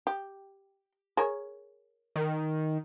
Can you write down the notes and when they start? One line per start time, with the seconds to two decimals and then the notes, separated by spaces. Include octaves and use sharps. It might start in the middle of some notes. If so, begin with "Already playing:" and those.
0.07 G4
1.17 G#4 A#4 C#5
2.16 D#3